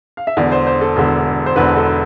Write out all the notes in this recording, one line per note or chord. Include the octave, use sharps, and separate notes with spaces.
F5
E5
E1 E2 D3 D5
C5
C5
A4
E1 E2 D3
C5
E1 E2 D3 B4
A4